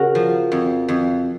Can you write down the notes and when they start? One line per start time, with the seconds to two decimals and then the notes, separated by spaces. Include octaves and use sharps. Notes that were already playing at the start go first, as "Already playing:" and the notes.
Already playing: C#3 F#4 G#4 A#4
0.15 F3
0.52 F2
0.88 F2